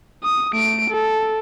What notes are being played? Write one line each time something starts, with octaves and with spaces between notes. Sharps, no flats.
D#6
A3 D7
A4